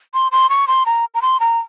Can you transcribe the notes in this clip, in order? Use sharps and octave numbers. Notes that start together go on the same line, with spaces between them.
C6
C6
C#6
C6
A#5
A#5
C6
A#5